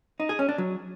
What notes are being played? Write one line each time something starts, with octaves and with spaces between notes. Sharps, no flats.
D#4
G#4
C#4
D4
F#3